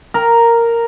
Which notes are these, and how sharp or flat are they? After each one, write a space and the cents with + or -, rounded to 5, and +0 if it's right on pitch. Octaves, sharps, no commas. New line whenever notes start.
A#4 -5